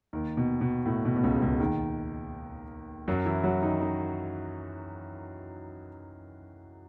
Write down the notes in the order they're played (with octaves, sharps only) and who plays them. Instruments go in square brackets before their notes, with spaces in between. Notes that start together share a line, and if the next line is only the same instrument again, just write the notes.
[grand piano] D#2 D#3
B2
B2
A2
B2
B2
C#2 C#3
C#2 C#3
D#2 D#3
F#2 F#3
E3 E4
F#3 F#4
D#3 D#4
D#3 D#4